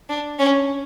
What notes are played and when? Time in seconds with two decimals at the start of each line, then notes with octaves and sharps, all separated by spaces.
0.09 D4
0.39 C#4